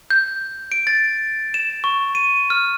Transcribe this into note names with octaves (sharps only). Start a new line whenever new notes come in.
G6
D7
A6
E7
C#6
D#7
F6